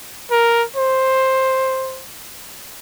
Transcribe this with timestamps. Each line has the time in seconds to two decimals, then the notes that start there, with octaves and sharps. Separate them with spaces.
0.31 A#4
0.76 C5